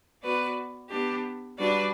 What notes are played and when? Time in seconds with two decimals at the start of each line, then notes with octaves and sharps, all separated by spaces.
0.22 B3 F#4 B4 D5
0.90 B3 D4 G4
1.58 G3 D4 F#4 B4 D5